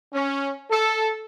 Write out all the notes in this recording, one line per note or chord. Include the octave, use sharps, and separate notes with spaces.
C#4
A4